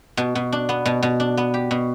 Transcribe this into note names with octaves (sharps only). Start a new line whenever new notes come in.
B2
B2
D4
B3
B2
B2
D4
B3
G4
B2